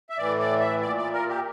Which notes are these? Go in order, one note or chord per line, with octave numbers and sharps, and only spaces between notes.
E5
A2 E3 D5
D5
E5
A#2 D5
D5
A#4
G4